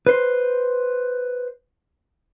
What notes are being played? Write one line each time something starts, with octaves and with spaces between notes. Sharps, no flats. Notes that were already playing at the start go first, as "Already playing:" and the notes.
B4 C5